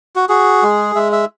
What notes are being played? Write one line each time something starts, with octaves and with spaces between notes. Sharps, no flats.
F#4
F#4 G#4
G#3
G#3 E5
E5